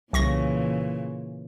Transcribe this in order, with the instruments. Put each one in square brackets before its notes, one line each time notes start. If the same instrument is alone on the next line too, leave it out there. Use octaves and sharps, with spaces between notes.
[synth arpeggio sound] C2 C#6 A#6 [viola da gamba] A#2 C#3 E3